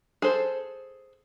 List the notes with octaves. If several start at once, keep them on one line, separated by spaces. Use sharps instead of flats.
G#4 A4 C5